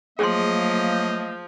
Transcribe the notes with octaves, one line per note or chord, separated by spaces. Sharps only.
F3 F#3 A3 A#3 G#4 D#5 C6